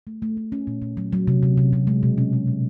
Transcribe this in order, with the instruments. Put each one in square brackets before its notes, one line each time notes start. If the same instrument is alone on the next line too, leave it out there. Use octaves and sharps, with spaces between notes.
[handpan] A3
A3
A3
C#4
A#2
A#2
F#3
F#3
C3
C3
C3
C3
G#3
B2
C#4
G#3
A#2